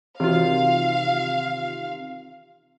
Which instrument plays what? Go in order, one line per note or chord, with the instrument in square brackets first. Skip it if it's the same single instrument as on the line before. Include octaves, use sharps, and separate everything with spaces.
[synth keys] C3 D#3 F4 [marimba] E3 F#4 [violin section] F5